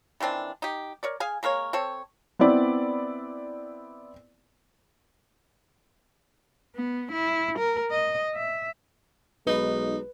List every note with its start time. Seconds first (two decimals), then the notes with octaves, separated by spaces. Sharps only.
0.20 D#3 E3 C4 D4
0.62 D#4 G4
1.03 A#4 C#5 D5
1.20 G#4 F5 G#5
1.43 G#3 A#3 A#4 C#5
1.73 C4 A4 C#5
2.39 B3 C4 E4 D5 B5
6.76 B3
7.12 E4
7.59 A#4
7.91 D#5
8.35 E5
9.47 B1 G#3 D#4 B4